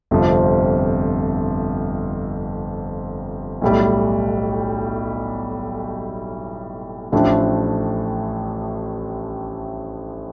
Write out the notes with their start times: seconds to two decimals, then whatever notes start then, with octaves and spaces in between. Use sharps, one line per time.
0.11 G1 F2 C3 F3 C4
3.61 B1 A2 G3
7.12 A1 A2 F3 A3 D4